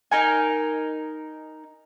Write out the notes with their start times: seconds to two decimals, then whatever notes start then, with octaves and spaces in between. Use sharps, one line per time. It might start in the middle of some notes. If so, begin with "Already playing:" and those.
0.11 D#4 A#4 G#5